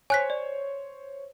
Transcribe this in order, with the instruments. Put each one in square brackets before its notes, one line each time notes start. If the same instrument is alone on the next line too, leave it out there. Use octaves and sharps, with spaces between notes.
[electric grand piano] C5 C#5 [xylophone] G#5 F#6 B6
[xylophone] D5